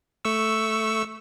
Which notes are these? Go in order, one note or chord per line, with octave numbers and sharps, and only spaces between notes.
A3 C#6 E6